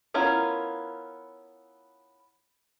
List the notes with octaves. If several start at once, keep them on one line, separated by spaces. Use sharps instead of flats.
B3 C#4 E4 F4 A#4